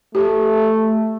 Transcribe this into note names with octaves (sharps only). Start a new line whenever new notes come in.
A3 G4